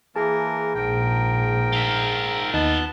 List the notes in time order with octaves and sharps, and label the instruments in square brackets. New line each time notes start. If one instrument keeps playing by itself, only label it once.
[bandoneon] E3 A#3 A#4 [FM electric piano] G#4 A5
[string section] A#1 [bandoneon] G#2 A#4 G5
[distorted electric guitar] F4 E5
[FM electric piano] D#2 D#4 [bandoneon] B3 A5 F#6